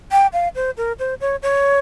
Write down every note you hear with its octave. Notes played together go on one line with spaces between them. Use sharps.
G5
F5
C5
A#4
C5
C#5
C#5